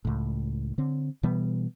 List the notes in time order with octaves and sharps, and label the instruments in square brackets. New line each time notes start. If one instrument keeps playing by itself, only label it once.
[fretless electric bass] C#2 A2
D3 C4
B2 E3 G3 B3